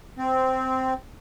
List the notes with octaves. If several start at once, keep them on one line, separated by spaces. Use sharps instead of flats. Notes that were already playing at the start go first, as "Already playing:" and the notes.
C4